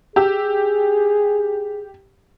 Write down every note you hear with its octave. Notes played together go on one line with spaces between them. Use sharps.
G4 G#4 E6